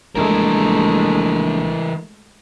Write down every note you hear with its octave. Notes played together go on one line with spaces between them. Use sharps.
A#1 E3 G#3 A3 A#4